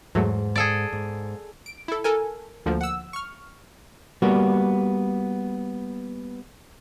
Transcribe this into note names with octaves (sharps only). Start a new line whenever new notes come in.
E2 G#2 F#3 A3
G#4 A4 D5
G#2
D7
E4 A4
A4 A#4 G#5
D2 D3 F3 A#3
F#5 E6
C#6 F6
G3 A#3 B3 F#4